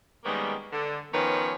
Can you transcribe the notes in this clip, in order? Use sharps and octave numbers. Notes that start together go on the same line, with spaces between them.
D#3 G3 G#3 A#3 B3 C#4
D3
D#3 F3 B3 C#4 B4 C#5